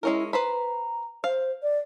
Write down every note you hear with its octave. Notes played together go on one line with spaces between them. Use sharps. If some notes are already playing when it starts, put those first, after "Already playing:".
G#3 C#4 E4 A#4
B4 C5 A#5 B5
C5 F5
D5